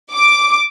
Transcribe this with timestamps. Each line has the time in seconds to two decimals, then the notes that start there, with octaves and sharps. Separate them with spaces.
0.12 D6